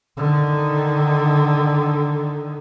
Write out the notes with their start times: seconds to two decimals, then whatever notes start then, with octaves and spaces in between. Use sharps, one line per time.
0.17 D3 D#3